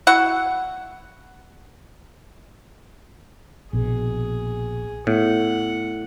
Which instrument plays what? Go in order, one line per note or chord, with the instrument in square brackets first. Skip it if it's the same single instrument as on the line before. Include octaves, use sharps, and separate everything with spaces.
[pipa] E4 F#4 F#5
[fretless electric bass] A#1 B2 [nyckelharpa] G#4
[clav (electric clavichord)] A2 [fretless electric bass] B3 [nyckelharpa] F#5